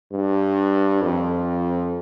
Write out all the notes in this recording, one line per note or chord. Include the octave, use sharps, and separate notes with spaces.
G2
F2